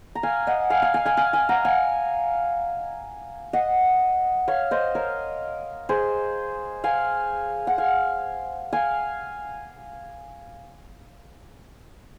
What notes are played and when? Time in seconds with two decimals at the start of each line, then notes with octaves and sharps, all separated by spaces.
0.15 A#5
0.23 F5 G#5
0.47 D#5 F#5
0.70 F5 G#5
0.82 F5 G#5
0.94 F5 G#5
1.05 F5 G#5
1.17 F5 G#5
1.33 F5 G#5
1.49 F#5 A#5
1.65 F5 G#5
3.53 D#5 F#5
4.48 C#5 F5
4.71 C5 D#5
4.95 A#4 C#5
5.89 G#4 C5
6.84 F5 G#5
7.67 F#5
7.78 F5 G#5
8.73 F5 G#5